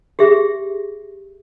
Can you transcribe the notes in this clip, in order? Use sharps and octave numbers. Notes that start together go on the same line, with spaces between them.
G4 G#4 E5